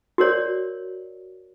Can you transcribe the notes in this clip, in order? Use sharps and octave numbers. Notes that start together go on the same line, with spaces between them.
F#4 A#4 C#5 D5